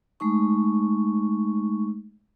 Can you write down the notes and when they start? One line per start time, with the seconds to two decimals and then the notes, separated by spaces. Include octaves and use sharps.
0.20 G#3 A3 D#4 C#6